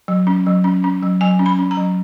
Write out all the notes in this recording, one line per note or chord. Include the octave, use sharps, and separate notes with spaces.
F#3
C#4
F#3
C#4
C#4
F#3
F#3 G#5
C#4
B5
C#4
A#5
F#3